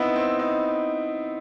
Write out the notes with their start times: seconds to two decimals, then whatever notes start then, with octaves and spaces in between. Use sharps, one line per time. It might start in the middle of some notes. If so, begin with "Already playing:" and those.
Already playing: B3 C4 D#4 E4
0.16 C4
0.39 D#4